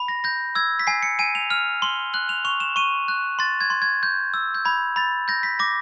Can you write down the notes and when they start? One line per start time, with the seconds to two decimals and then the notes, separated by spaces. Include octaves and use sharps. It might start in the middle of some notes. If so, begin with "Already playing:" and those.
Already playing: B5
0.08 A#6
0.24 G6 A#6
0.55 E6 G#6
0.79 B6
0.87 G#5 C7
1.03 C#7
1.19 G#5 D#7
1.35 F7
1.50 F6 F7
1.82 C6 G7
2.14 F#6 F#7
2.29 F7
2.45 C#6 F7
2.60 E7
2.76 C#6 D#7
3.08 F#6
3.39 C6 A6
3.61 G#6
3.70 C6
3.82 G#6
4.03 G6
4.34 E6
4.55 G6
4.65 B5 G#6
4.96 B5 A6
5.28 G6 A#6
5.43 B6
5.59 D6 A#6